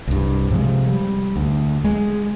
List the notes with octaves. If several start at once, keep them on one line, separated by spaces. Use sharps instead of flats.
C2 G2
C3 F3 G#3
G3
D2
G#3